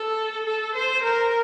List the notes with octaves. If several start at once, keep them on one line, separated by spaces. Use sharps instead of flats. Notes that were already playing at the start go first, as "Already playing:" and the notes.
Already playing: A4
A4
C5
A#4